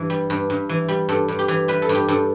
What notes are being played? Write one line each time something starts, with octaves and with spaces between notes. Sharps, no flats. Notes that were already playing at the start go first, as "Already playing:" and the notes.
Already playing: G2 E3
G3
G2
G2
E3
G3
G2 A4
G2
G4
E3
G3 B4
A4
G2
G4
G2 A4